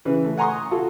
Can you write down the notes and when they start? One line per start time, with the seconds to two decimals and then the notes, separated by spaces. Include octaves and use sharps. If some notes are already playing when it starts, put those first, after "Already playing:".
0.05 C#3 E3 B4
0.24 A3
0.37 F#5 G#5 A#5 C6 C#6 D#6
0.71 F4 F#4 A4